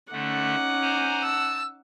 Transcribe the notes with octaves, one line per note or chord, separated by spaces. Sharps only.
D3 A3 C#4 D#4 F#5 D6
C5 G#5 A#5
A5 E6